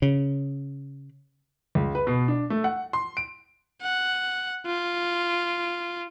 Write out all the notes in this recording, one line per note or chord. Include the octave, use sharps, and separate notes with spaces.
C#3
C#2
B4
B2
D4
A3
F#5
C6
D7
F#5
F4